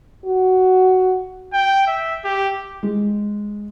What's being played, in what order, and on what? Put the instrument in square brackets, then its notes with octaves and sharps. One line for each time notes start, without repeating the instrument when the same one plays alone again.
[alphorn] F#4
[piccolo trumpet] G5
E5
G4
[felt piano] G#3